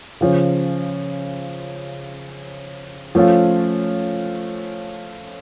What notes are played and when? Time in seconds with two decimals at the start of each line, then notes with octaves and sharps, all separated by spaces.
0.21 C#3 F3 C#4
3.15 F3 A3 C#4 F4